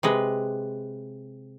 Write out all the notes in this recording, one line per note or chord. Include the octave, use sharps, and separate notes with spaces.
C3 G#3 B4